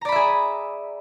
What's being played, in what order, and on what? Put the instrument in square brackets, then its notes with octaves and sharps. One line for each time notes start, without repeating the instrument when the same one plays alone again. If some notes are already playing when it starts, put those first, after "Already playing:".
[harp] A#5
D5
B5
E5
G#4